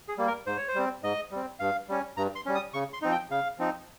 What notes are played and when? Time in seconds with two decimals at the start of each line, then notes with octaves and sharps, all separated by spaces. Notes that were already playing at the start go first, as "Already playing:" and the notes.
0.08 G#4
0.18 G3 A#3
0.27 A#4
0.46 G#2 C5
0.57 C#5
0.68 C5
0.75 G3 C4
1.03 G#2 D#5
1.31 G3 C4
1.59 G2 F5
1.89 G3 C#4
2.17 G2 A#5
2.35 C6
2.46 G3 C#4
2.55 D#6
2.73 C#3 C#6
2.93 C6
3.02 F3 C4 D#4
3.12 G5
3.30 C#3 F5
3.58 F3 C4 D#4